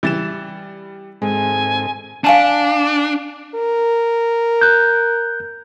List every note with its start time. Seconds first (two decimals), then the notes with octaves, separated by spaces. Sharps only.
0.03 E3 G3 A6 E7
1.22 G#2 G#3 C4 A4 G#5
2.24 D4 F5 G#5 A5
3.55 A#4
4.61 F#6 G6